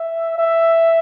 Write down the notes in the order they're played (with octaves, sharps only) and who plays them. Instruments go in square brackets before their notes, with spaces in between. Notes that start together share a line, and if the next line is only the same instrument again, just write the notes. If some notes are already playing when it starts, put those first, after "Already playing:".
Already playing: [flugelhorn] E5
E5